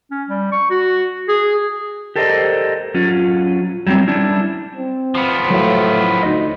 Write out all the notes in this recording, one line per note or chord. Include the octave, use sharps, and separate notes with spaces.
C#4
G3
C#6
F#4
G#4
G4 A4 A#4 C5 D5 D#5
F#3 C#4 F4
F#3 G3 B3 C4
G3 C#4 D4 E4
C4
F3 B3
A2 F#3 F5
D2 D#4 D#5